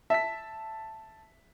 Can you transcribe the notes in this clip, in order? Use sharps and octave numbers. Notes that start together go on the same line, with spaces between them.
E5 A5 B6